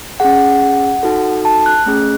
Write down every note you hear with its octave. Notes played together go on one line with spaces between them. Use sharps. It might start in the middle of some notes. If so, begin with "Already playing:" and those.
C#4 G#4 F#5
D#4 F#4 A4
A5
F#6
A3 C#4 G#4